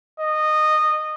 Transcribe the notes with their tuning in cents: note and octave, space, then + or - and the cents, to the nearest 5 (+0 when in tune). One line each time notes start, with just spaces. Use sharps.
D#5 -15